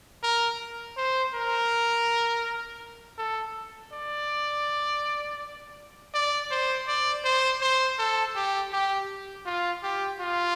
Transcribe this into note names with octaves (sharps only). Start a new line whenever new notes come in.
A#4
C5
A#4
A4
D5
D5
C5
D5
C5
C5
A4
G4
G4
F4
G4
F4